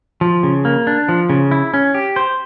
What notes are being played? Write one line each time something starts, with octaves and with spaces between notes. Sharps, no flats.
F3
C#3
A#3
D4
F3
C#3
E4
C#4
G4
C5